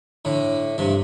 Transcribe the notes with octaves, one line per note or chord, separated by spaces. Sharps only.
A2 D3
G2 C3